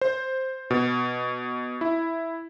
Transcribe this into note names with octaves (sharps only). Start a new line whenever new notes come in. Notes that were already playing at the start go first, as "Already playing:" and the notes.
C5
B2
E4